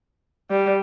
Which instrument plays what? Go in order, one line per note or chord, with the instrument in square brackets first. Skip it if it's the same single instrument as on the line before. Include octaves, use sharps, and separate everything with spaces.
[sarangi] G3